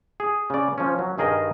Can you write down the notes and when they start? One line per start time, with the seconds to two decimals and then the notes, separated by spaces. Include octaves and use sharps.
0.20 G#4
0.50 C#3 D5
0.78 F3 C#4
0.99 F#3
1.18 G2 D#3 G#4 A#4 D#5